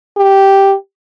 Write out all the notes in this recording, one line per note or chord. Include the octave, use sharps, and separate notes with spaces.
G4